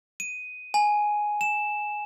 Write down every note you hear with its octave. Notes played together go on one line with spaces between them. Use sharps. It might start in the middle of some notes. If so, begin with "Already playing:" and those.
D#7
G#5
E7